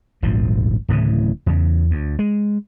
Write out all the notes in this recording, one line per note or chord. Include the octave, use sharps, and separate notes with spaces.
D#1 G#1 D2 F3
D1 A2 C#3 E3
E2 C#3
D2
G#3